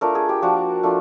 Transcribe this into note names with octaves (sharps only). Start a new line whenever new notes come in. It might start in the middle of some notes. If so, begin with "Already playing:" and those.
A3 D4 F4 A#4
G#4
G4
F3 A#3 D4 F#4
F3 A3 D4 F4